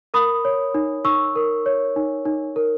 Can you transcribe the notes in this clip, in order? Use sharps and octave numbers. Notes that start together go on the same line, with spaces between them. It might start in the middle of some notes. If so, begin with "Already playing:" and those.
A#4 B5 D#6
C#5
D#4
D#4 C#6 E6
A#4
C#5
D#4
D#4
A#4